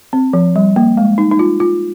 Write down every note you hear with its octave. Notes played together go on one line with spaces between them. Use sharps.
C4
F3
G3
A#3
G#3
D#4
D#4
F4
F4